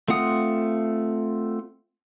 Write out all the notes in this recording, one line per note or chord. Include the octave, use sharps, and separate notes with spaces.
A3 C4 F4 F#5 D#6